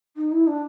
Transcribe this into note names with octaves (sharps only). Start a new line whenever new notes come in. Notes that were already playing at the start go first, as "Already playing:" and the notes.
D#4
E4
D4